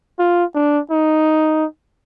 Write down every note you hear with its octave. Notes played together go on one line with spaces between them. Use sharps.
F4
D4
D#4